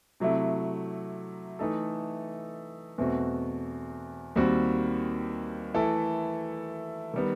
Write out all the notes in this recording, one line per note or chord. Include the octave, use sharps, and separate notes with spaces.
C3 F#3 A3 E4
E3 A3 D#4 A4
E2 B2 A3 C4 F#4
D#2 D#3 G3 C4 F#4
E3 A3 E4 A4
D#3 G3 B3